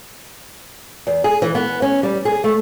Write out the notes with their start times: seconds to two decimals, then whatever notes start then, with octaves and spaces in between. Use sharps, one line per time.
1.07 E2
1.24 G#4
1.42 E3
1.55 B3
1.82 C#4
2.03 G3
2.25 G#4
2.44 A3